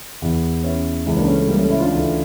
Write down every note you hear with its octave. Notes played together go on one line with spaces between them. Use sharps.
E2 E3
C#4 E4
C#2 C#3 E3
A#3 D4
A3 C#4
A3 C#4
G3 A#3
A3 C#4
C#4 E4
D4 F4
D2 C#3 E3